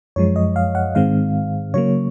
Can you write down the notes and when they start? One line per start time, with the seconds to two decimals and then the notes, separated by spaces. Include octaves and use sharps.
0.16 F#2 F3 G#3 C#5
0.36 D#5
0.56 F5
0.75 F#5
0.95 G#2 D#3 G#3 C4 F5
1.74 C#3 F#3 A#3 C#5